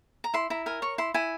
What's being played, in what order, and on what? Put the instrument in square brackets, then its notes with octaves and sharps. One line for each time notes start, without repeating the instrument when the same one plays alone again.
[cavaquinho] A#5
E4 C6
E4 A#5
A#4 G#5
C#5 C#6
E4 C6
E4 G#5